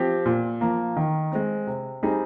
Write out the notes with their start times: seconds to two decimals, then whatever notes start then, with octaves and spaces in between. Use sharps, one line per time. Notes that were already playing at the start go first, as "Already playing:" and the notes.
Already playing: F3 C4 G4
0.26 A#2
0.61 F3 A#3
0.97 D#3
1.32 G#3 C4
1.67 C3
2.03 G3 C4 D#4 G#4